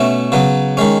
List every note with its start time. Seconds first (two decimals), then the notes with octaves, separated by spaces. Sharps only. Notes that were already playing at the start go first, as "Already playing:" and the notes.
Already playing: B2 A3 C#4 E4
0.32 C#3 F#3 B3
0.77 D#3 G#3 C#4